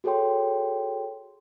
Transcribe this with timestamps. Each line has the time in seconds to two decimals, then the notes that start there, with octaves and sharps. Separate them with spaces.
0.04 F#4 G#4 A4 C#5 G5 C6